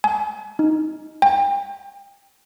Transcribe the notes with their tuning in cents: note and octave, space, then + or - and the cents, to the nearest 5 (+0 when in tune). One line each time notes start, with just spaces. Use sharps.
G#5 +30
D#4 +0
G5 +30